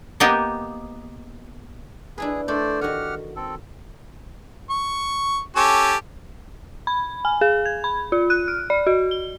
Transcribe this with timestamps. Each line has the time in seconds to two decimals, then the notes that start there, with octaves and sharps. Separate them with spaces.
0.20 A#3 B3 D#4 G4
2.18 D4 E4 G#4 B4
2.48 A3 D4 A4 C5 D5
2.81 D#3 F#4 G4 F#5 F6
3.36 C4 A4
4.70 C#6
5.56 C#4 G4 A4
6.87 B5
7.25 G#5
7.41 G#4
7.66 G#6
7.84 B5
8.12 F4
8.30 F#6
8.48 F6
8.70 D5
8.87 F#4
9.11 G7